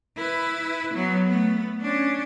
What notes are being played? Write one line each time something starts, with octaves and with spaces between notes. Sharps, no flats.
E4 B4
F#3 B3
A3 B3
C#4 D4